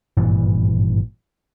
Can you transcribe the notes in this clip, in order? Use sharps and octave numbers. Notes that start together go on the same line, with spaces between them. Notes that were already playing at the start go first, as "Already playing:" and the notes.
G#1 G2 A#2 E3